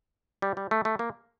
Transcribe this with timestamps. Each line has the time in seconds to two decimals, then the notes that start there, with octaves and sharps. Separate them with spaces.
0.42 G3
0.57 G3
0.71 A3
0.85 A3
0.99 A#3